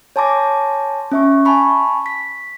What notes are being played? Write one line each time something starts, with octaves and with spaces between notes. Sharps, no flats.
C#5 G#5 A5 C6 D6 A#6
C#4 E5 C#6
G#5 A5 B5 C#6
B6